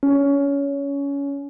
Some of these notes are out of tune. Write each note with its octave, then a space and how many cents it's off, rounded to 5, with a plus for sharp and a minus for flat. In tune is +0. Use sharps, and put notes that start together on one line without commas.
C#4 +20